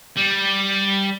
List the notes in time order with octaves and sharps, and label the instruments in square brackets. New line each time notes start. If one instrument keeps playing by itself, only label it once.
[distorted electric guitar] G3